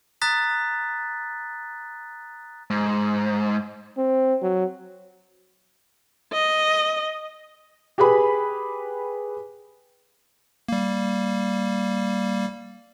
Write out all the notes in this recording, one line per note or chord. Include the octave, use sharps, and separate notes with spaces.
A#5 D#6 F#6 A6 B6
G#2
C4
F#3
D#5
G4 G#4 B4 B5
G3 A#3